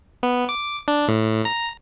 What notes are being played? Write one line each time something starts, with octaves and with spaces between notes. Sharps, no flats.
B3
D6
D4
A2
A#5